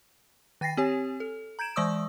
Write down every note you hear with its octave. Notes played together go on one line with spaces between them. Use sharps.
D#3 G5 A6 A#6 C7
C4 G4 C#5 G#5
A4
A#5 G6 G#6 D7 E7
E3 G#3 D5 C#6 D#6 E6